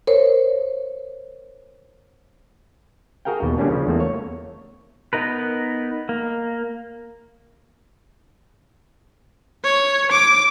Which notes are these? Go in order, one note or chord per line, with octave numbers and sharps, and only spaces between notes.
A#4 C5 C#5
F#4 G#4 A#4 F5 G5
D#2 B2
D3 G3 A#3 C#4 D4
C#3 F3
E2 A3 A#3
C#5
B3 D#4 A#4 B4
A#3
C#5
D6